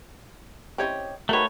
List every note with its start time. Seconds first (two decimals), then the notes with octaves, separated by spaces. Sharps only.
0.78 C4 C#4 E4 G4 C#5 D#5
1.29 D#3 E3 A3 F#4 A#4 B4 C#5